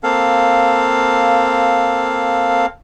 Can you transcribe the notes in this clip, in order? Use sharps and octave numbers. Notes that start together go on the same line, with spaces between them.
A#3 C4 A4 F5